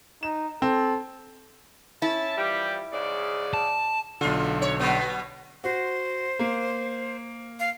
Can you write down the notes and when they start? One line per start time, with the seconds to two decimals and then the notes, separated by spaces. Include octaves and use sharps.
0.23 D#4 E7
0.62 C4 A4
2.02 C#4 E4 A5
2.38 E3 F3 G3 G4
2.93 G#2 C#3 D5
3.53 A5
4.21 B1 D3 F4
4.62 C#5
4.80 B2 F#3 B3
5.64 F#4 C5
6.39 A#3
7.60 F5